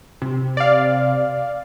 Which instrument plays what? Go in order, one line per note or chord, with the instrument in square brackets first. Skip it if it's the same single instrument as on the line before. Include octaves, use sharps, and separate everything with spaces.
[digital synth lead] C3
[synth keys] D5 F5